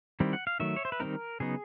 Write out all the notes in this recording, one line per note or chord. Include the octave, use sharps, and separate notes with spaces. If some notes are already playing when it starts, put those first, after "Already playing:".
D#3 G3 C4 E4
F#5
F5
D#3 F#3 A3 E5
C#5
C5
B4
D#3 G3 C4 D#4 A#4
C#3 F#3 B3 D#4 G#4